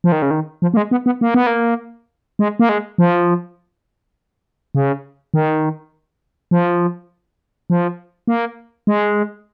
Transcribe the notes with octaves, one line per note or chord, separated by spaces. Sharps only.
F3
D#3
C#3
D#3
F3
A#3
G#3
B3
B3
A#3
B3
A#3
G#3
A#3
G#3
F3
C#3
D#3
F3
F3
A#3
G#3